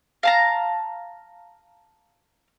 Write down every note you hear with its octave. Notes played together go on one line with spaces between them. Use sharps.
F5 A5 A#5